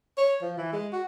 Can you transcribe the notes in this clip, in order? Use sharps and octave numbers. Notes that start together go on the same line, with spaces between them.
C#5
F3
E3
G#3
F#4